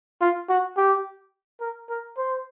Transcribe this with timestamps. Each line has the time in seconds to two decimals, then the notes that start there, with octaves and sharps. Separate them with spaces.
0.21 F4
0.49 F#4
0.77 G4
1.61 A#4
1.90 A#4
2.17 C5